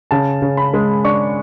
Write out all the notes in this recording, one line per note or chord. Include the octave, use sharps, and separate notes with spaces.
C#3 A5
C#3
B5
G#3
D4 C#6